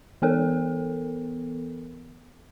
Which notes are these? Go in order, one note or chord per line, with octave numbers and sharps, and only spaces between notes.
E3 B3 A4 A#4